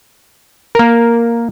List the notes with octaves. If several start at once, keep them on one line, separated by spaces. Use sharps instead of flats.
A#3 A#4